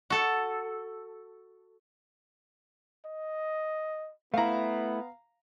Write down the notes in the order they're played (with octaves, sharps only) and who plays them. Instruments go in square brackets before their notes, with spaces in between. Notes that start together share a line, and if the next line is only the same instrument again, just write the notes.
[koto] F#4 A4
[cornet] D#5
[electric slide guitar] A3 E4 [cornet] B3 [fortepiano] F5 A#5